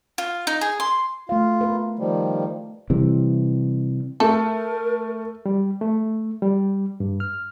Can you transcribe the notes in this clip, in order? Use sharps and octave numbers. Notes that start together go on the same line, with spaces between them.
F4
D#4
G#4
C6
A3 F4 F5
A#4 B4
D#3 F3 G3
C3 E3 G3
A3 A4 A#4
G3
A3
G3
G2
F6